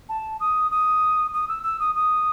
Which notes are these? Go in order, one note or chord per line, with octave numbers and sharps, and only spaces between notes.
A5
D#6
D#6
D#6
E6
E6
D#6
D#6